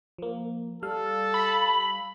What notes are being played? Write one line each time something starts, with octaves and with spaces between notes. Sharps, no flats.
F3 A#3
G3 A4 F5
B5